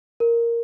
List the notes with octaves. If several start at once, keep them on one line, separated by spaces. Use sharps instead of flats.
A#4